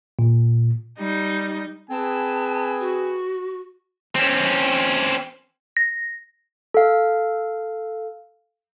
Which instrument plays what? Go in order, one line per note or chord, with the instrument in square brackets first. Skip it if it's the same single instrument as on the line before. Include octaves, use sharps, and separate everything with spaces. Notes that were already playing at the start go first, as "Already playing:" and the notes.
[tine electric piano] A#2
[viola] G3 D#4
[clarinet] C4 [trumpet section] G#4 B4 G#5 [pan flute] A5
[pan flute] F#4
[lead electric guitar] C4 C#4
[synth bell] A#6
[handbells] A4 F5